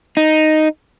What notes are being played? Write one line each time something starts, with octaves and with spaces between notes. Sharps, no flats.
D#4